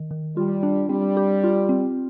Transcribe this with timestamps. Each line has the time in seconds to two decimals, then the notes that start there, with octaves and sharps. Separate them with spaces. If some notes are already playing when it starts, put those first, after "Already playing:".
Already playing: D#3
0.11 D#3
0.36 G3 F4
0.63 D4
0.89 G3 C4
1.17 G4
1.44 F4
1.69 C4